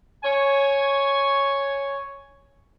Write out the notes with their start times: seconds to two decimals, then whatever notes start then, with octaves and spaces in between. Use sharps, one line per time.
0.24 C#5 G#5